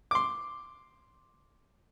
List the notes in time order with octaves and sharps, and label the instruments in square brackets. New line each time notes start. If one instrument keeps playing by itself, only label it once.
[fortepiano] C6 D6